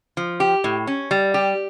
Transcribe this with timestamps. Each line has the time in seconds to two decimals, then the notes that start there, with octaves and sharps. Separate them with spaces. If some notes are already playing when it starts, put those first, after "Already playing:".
0.17 F3
0.40 G4
0.64 A2
0.87 C#4
1.11 G3
1.34 G4